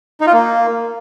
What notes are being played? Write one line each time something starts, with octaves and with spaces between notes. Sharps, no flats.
D#4
F4
A#3